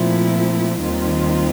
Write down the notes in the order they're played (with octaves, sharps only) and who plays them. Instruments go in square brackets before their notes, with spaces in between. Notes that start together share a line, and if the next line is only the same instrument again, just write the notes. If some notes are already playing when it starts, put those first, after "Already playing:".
Already playing: [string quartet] A#2 F3 A3 C4 E4
D#2 D#3 G3 C4 F4